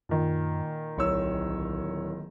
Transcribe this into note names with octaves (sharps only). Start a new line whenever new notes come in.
F#2 A#2 D#3
D1 B1 C#5 E6